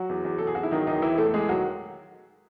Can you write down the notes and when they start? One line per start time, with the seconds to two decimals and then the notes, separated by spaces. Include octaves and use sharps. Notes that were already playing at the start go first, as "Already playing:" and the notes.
Already playing: F#3 F#4
0.09 E2
0.25 E2
0.38 E2 A4
0.47 G#4
0.55 E2 F#4
0.63 E4
0.71 D#3 F#3 D#4
0.87 E2 D#3 D#4
1.02 E2 E3 E4
1.17 E2 A3 A4
1.28 A4
1.34 E2 G#3 G#4
1.49 D#3 F#3 F#4